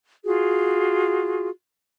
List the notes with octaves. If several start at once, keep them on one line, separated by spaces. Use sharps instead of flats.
F4 F#4 G#4